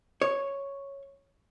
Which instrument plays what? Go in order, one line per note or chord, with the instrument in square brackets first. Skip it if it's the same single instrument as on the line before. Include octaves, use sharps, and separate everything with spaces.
[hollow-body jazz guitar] C#5